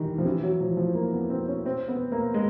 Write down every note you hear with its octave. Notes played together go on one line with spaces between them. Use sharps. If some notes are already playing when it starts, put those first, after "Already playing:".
Already playing: D#3 E3 G3
F3
E3
F#3
F3
F3
A#3
B3
C4
C#4
C4
B3
A#3
G#3